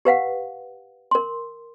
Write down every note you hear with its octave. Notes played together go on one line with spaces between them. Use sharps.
G4 B4 F5 F#5
A#4 C6